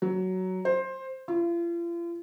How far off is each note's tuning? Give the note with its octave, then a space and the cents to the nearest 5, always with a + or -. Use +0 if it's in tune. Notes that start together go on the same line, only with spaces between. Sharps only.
F#3 +10
C5 +15
F4 -40